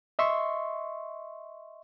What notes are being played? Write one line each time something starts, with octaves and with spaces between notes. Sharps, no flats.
D#5 E5 C6 C#6